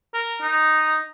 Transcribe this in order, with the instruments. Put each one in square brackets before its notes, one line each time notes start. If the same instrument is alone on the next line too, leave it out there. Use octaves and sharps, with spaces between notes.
[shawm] A#4
D#4